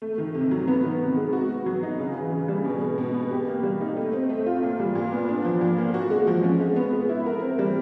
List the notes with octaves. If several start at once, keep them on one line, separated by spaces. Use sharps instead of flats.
A3
D#3
C3
F#3
B3
D#3
C3
G#3
F#4
B3
F#3
D#4
C#3
E3
C#3
G3
B2
G#3
B2
B3
G4
A#3
G3
D#4
A3
C4
A3
F4
A#2
G3
A#2
B3
D4
F3
A#2
A#3
F#4
G#3
F3
C#4
G#3
B3
G#3
E4
A#4
C4
G3